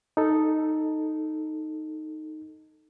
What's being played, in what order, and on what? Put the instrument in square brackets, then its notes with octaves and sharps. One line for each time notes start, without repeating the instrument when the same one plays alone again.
[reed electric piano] D#4 A4